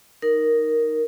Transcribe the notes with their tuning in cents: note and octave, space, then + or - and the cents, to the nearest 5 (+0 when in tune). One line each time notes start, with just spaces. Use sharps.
D#4 -5 A#4 +0